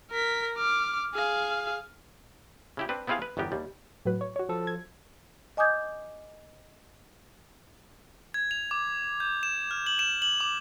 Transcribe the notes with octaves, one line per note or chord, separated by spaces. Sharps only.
A#4 B6
D6 F6
G#4 F5
C#3 E4 G4
C4 D4 B4
B3 C4 E4 F4 G#4 F5
B4
G1 E2 E3 B3 G4 A#4
D#2 G3
A2 F#3 B4
C#5
F#4 C#5
F3 A4
G#6
D#5 G#5 D6 D#6 G6 G#6
G#6
F7
D6
G6
E7
F6
F#7
E7
F#7
D6